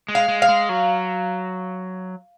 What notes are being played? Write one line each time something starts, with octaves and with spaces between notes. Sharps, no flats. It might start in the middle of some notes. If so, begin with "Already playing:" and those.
G#3
F5
G#3
F5
G#3
F#3